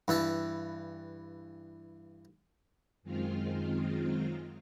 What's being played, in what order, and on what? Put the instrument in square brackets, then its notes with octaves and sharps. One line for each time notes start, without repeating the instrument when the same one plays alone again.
[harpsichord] G2 E3 E5 A5
[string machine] F#2 D#3 G#3 C4 F4 F6